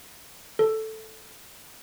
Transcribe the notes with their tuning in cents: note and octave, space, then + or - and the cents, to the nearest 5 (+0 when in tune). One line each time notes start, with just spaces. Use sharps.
A4 +0